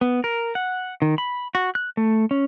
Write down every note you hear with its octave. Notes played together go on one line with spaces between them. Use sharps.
B3
A#4
F#5
D#3
B5
F#4
F#6
A3
C#4